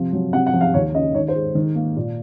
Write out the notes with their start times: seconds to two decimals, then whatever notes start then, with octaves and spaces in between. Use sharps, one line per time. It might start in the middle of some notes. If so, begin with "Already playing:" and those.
Already playing: C3 F3
0.13 F#3
0.33 C3 F#5
0.46 F#5
0.53 F3
0.61 F5
0.74 D#2 C#5
0.94 C#3 D#5
1.15 D#3 C#5
1.28 C5
1.35 G#3
1.55 D#3
1.75 A#3
1.96 A#2